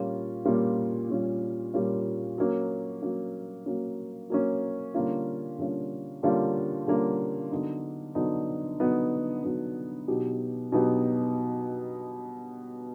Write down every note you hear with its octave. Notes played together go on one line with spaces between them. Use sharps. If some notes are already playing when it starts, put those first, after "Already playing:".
Already playing: A#2 G3 A#3 C#4 F4
A#2 G3 A#3 C#4 F4
A#2 G3 A#3 C#4 F4
A#2 G3 A#3 C#4 F4
F#3 A#3 C#4
F#3 A#3 C#4
F#3 A#3 C#4
F#3 A#3 C#4
D3 G3 A#3 C#4 F4
D3 G3 A#3 C#4 F4
D3 G3 A#3 C#4 F4
D3 G3 A#3 C#4 F4
D3 F#3 B3 D#4
D3 F#3 B3 D#4
D3 F#3 B3 D#4
D3 F#3 B3 D#4
B2 F#3 B3 D#4 G4
B2 F#3 B3 D#4 G4